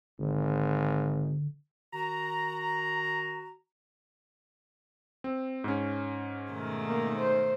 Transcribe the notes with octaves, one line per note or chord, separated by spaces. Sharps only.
G#1 D3
D#3 F#4 A#5
C4
G#2 C#4
B2 D#3 A3
A#3
C5